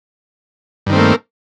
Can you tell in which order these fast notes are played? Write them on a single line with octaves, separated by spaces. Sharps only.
G2 D#3 C4 A3 A#3